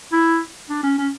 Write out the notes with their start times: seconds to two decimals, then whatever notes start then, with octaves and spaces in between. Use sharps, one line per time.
0.13 E4
0.69 D4
0.83 C#4
0.98 C#4